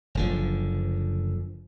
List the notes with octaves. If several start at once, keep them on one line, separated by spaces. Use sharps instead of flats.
F#1 D3 F3